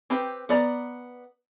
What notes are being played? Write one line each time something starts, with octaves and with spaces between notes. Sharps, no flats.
C4 G4 B4
B3 D5 A#5